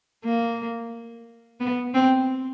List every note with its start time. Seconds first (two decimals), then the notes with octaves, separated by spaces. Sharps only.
0.25 A#3
1.60 B3
1.94 C4